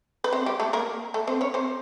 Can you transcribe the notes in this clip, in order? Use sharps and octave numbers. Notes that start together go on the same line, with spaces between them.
B4
C4 C5
G3 G4
A3 A4
A#3 A#4
A3 A4
C4 C5
C#4 C#5
C4 C5